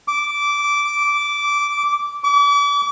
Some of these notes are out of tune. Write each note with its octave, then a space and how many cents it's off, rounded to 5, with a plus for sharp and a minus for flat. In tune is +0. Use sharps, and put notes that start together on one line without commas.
D6 -15
D6 -40